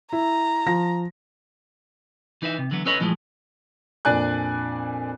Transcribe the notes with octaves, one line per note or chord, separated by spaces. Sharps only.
E4 A#5
F3 A#6
E3 D#4 B4 D5 E5
C3
D3 E3 F#3 B3
C#4 A4 B4 C#5 D#5 B5
A#2 E3 F3 G#3 A3
F2 A#2 D4 D5 G#5 F#6